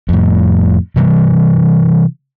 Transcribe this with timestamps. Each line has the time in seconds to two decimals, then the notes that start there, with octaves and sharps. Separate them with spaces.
0.09 F2 A2
0.96 C3 E3 G3